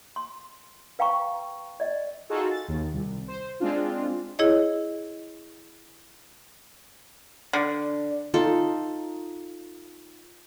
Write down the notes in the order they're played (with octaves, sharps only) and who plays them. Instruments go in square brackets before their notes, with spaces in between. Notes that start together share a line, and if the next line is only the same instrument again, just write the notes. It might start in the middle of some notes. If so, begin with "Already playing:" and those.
[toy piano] C6
B4 F5 G5 A#5 C#6
D5 D#5
[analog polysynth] D#4 F4 F#4 G#4 A4
A6
D#2
C2
C5
G#3 C4 D4 F4
[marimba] E4 G#4 C#5 D#5
[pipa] D3
[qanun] D#4 F4 A4